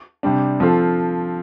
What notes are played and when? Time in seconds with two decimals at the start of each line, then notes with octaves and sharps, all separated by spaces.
0.23 C3 G3 D4
0.60 F3 C4 F4 A4